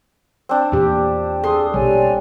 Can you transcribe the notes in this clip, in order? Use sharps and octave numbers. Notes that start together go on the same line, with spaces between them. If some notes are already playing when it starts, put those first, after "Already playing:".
C4 D4
E2 A#2 G4
G#4 A4 C6 D#6
A#1 B2 G3 C#5 D5 G#5